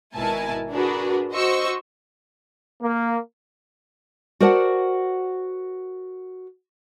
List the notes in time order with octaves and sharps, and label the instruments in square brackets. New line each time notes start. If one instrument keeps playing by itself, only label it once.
[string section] G#1 B2 E4 A#4 G#5 A5
D4 F#4 G#4 A#4 B4
F#4 C5 D#5 C#6 E6
[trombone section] A#3
[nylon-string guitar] F#4 A#4 C5 D5 F#5 A5